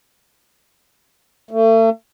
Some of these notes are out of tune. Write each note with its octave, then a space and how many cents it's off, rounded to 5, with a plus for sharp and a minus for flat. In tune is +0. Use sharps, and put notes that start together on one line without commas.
A3 +35